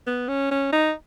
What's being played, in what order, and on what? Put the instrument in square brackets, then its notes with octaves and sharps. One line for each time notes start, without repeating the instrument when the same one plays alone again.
[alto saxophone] B3
C#4
C#4
D#4